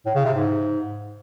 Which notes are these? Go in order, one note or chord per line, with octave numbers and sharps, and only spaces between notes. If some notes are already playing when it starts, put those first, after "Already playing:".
A2
C#3
C3
G#2